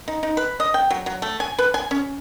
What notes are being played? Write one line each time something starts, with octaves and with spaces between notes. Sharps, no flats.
D#4
D#4
B4
D#5
G5
F#3
F#3
A3
G#5
B4
G#5
C#4